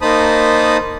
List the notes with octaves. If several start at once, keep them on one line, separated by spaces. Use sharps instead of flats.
A#3 D#4 C5 A5 B5 D#6